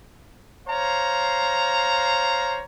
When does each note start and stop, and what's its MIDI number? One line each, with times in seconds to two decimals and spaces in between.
0.68 2.63 72
0.68 2.63 73
0.68 2.63 77
0.68 2.63 82